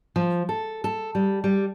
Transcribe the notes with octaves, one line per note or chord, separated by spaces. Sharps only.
F3
A4
A4
G3
G3